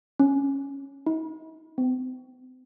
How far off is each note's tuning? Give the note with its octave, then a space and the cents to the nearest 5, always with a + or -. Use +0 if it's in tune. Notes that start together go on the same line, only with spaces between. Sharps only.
C#4 -5
D#4 +40
C4 -45